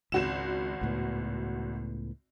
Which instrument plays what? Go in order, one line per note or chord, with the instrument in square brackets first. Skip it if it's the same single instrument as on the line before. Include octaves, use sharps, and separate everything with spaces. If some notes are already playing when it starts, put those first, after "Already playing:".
[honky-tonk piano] G#1 F#4 E7 [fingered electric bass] C#2
[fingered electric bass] C#2 A2 B3